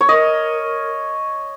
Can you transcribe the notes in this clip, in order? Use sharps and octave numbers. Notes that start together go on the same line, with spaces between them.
C#5
A#4 D#5